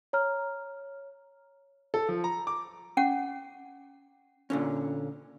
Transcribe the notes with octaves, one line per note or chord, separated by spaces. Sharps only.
C#5 A#5 F6
A4
F3
A#5
D6
C#4 F#5
A#2 D3 C#4